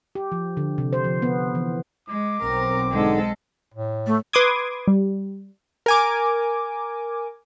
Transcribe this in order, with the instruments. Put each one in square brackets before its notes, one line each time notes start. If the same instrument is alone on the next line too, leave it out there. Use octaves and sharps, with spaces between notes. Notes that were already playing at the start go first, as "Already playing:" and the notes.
[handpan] G4
F3
D3
C3
C5
F3
B3
E3
[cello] G#3 [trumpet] D6
[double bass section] B1 C4 [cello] A#4
[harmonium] G#2 D3 [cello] G#3 A4
[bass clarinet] A2
[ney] A3
[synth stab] B4 C6 D6 D#6 G#6
G3
[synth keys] A#4 G#5 D6